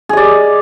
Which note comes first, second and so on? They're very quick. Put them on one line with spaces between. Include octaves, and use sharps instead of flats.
G#4 D#5 D5